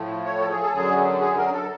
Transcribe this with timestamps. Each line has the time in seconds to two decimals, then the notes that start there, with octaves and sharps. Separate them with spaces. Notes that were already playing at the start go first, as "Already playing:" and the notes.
Already playing: A2 F3 A3
0.25 C#5
0.41 A4
0.49 G#4
0.63 A4
0.73 F#2 D3 F#3 G#4
1.21 G#4
1.37 A#4
1.53 A4